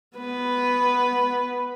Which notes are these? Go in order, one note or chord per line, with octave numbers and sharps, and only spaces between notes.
B3 B4